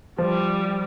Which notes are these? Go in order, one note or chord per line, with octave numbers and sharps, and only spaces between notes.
F3 G3